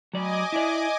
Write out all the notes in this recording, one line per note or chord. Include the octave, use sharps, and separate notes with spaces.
F#3 D5 D#5 G#5 D6
E4 D5